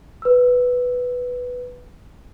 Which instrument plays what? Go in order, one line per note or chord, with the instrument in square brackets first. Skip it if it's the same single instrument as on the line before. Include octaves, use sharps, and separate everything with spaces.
[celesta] B4 E6